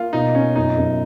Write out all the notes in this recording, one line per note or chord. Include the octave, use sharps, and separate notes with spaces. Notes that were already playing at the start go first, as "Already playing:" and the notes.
Already playing: A#3 F4
B2 D#4
C#4 F4
F#2 D#4
F#2